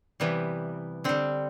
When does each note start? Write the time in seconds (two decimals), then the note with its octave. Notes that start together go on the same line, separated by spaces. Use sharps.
0.20 C3 E3 G3 B3
1.04 D3 G3 C4